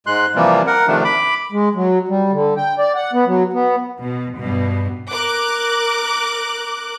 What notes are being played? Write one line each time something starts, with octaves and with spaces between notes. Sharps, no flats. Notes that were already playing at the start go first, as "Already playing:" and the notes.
G#2 G#3 C6 F#6
C3 E3 F3 G3 A#3
A#4 F#5
C3 D#3 F3 A3 D4
B5 D6
G#3
F#3
G3
D3
G5
D5
F#5
B3
F#3
B3
B2
G2 B2
A#4 D6 F#6